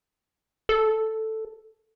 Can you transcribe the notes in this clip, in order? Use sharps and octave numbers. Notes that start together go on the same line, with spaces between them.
A4